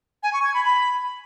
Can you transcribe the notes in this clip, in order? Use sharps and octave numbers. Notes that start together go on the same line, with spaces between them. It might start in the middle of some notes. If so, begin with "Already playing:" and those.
G#5
C#6
G#6
B5
B5